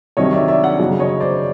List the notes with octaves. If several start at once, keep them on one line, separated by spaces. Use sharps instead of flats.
C2 C3 D#3 F#3 C#5 D#5
D5 E5
D5 E5
E5 F#5
G1 F#2 C#3 F#3
C#5 D#5
C5 D5